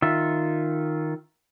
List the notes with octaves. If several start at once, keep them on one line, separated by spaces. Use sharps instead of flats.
D#3 F4 E5